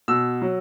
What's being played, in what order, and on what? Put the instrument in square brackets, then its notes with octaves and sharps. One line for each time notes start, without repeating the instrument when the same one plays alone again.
[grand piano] B2 E6
F#3